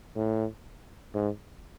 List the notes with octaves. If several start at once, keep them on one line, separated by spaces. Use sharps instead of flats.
A2
G#2